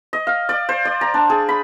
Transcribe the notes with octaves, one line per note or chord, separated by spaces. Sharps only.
D#5
F5
D5
C5
D5
A#5
D4
G#4
B5